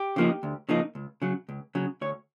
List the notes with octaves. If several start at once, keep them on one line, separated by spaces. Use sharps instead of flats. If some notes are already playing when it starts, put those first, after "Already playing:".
Already playing: G4
C#3 F3 A#3 D#4
D2
C#3 F3 A#3 D#4
C#2
C#3 F#3
C#2
C#3 F#3
D2 C#5